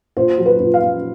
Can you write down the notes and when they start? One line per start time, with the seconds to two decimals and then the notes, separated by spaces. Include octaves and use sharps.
0.17 A#2 C5
0.38 F#3
0.46 B4
0.60 A#2
0.74 F5
0.81 A#2